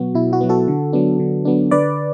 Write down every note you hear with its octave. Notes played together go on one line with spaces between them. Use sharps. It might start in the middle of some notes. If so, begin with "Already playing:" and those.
Already playing: B2 F#3 B3 F#4
B2 E4
F#4
F#3 B3
F#4 A4
D3
F#3 B3 D4
D3
F#3 B3 D4
D3 B4 D5